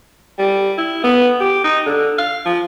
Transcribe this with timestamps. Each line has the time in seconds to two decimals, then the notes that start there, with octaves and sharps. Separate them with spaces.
0.39 G3
0.78 E4
1.04 B3
1.40 G4
1.64 D#4
1.86 D3
2.18 F5
2.46 F3